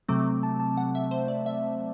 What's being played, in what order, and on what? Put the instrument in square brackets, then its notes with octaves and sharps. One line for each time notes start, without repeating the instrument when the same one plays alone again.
[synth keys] C3 F#3 A3 C4 D6
A5
A5
F#5
E5
C5
D5
E5